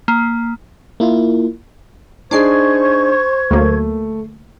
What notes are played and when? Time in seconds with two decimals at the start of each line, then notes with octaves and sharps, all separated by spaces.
0.08 A#3
1.00 A#3 E4 F4
2.31 D4 D#4 G#4 C5 C#6 D6 G#6 C7
3.51 D2 F#3 A3 A#3